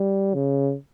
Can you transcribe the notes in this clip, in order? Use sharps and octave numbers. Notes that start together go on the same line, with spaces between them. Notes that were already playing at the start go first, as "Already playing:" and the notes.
Already playing: G3
C#3